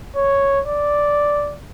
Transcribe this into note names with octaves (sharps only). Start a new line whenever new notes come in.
C#5
D5